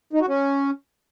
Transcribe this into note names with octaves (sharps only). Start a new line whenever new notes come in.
D#4
F#4
C#4